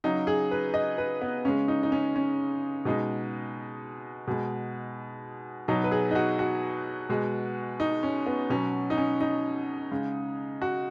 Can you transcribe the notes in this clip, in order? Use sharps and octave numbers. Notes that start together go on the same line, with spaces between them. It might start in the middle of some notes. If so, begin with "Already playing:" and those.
C#3 F#3 D#4
G#4
B4
D#5
B4
B3
C#3 G#3 C#4
D#4
D#4
C#4
C#4
B2 G#3 D#4
B2 G#3
B2 F#3 D#4
B4
G#4
D#4
F#4
F#4
B2 G#3
D#4
C#4
B3
B2 F#3 C#4
D#4
C#4
D#4
C#3 G#3
F#4